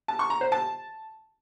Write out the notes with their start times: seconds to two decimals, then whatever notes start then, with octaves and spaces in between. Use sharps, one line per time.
0.08 A5
0.19 C#6
0.30 A#5
0.41 C5
0.52 A5